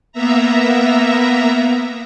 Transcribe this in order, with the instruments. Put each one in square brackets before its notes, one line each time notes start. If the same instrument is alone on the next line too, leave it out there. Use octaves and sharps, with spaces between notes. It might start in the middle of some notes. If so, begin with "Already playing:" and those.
[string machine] A#3 B3 E5 A#5